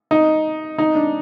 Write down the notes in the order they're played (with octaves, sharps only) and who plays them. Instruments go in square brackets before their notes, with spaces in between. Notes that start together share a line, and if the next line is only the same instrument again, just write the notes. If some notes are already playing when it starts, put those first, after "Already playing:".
[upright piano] D#4
D#4
D4